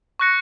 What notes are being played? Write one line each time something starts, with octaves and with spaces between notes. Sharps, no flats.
C#6 F#6 A#6 C#7